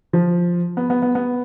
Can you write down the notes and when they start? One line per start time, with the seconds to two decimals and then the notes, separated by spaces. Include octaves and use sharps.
0.13 F3
0.77 B3
0.90 B3
1.02 B3
1.15 B3